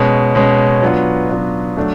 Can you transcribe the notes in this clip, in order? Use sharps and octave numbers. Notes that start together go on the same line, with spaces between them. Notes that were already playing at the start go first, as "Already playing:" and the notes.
Already playing: B2 G#3 C#4
B2 G#3 C#4
F#3 B3 D4 F4
F#3 B3 D4 F4
F#3 A3 D4